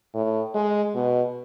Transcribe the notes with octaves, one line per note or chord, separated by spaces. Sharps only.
A2
G#3
B2